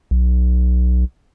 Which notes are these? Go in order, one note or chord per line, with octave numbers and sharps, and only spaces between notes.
B1